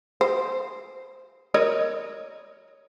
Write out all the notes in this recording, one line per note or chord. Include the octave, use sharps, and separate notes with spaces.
C5
A#4 C#5 D#5